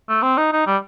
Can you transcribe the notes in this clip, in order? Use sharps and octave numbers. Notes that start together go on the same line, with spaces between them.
A3
C4
D#4
D#4
G3